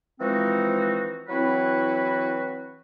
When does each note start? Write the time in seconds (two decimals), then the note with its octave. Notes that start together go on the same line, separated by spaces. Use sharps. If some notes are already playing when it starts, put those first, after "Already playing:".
0.20 E3 F3 G#3 C4 D#4 F#4
1.29 E3 F#3 C4 E4 F#4 B4